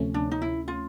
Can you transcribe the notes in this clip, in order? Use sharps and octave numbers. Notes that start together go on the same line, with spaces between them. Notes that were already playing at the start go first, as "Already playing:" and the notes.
Already playing: D2 C3 F3 A3 C#4
D4
D#4
E4
F4